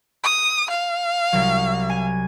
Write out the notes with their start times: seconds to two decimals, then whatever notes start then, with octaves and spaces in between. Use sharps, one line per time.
0.24 D#6
0.70 F5
1.32 C2 F#3
1.90 G#5